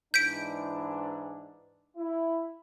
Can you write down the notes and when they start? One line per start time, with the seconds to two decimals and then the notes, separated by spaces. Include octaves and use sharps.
0.14 G#2 E3 D4 G6 B6 D7
1.97 E4